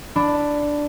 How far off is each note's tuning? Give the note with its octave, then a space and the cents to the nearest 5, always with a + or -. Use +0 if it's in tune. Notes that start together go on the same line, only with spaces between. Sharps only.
D4 +0 B5 +15